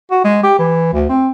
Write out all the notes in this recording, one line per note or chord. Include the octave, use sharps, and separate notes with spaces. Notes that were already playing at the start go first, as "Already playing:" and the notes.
F#4
G#3
G4
E3
D2
C4